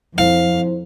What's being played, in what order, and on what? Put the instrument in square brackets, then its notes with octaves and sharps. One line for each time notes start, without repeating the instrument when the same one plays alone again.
[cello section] F2 [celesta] E4 C5 [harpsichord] F5